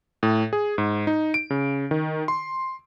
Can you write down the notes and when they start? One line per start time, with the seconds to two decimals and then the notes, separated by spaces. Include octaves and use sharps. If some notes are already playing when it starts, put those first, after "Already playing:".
0.23 A2
0.53 G#4
0.78 G#2
1.07 D#4
1.34 D7
1.50 C#3
1.91 D#3
2.28 C6